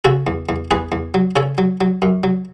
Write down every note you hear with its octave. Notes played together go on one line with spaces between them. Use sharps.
C#3 F#4 A4
E2
E2
E2 G#4 B4
E2
F#3
C#3 A4 C#5
F#3
F#3
F#2
F#3